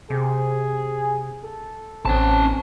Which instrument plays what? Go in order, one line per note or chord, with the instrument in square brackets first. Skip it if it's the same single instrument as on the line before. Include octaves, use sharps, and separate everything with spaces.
[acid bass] C3 [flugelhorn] G#4
[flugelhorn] A4
[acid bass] A1 [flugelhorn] C4 [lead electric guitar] C#4 A5